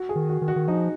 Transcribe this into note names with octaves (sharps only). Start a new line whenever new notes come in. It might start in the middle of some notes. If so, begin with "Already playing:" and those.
Already playing: F#4
G#4
D#3
F#4
D#3
F#4
D#3
F3 D#4